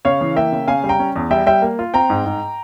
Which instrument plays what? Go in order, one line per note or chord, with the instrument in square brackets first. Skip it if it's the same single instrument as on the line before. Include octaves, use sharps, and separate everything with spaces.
[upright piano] C#3 C#5 F5
E3
A#3 E5 G5
C#3
C#3 F5 G#5
G3
G5 A#5
C#4
E2
G3 E5 G5
G3 E5 G5
A#3
F4
C4 G5 A#5
G#2
G#2